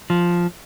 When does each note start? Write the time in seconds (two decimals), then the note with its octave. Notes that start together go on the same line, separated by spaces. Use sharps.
0.10 F3